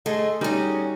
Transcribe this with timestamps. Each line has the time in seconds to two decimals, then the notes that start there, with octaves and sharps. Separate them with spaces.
0.06 A3 G#4 A4 D#5 C6
0.41 G3 C#4 D#4 F#4 G#4